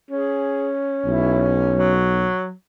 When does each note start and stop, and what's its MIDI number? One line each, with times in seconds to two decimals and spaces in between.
0.11 1.93 61
0.11 0.70 68
1.06 2.28 35
1.06 1.49 64
1.76 2.52 54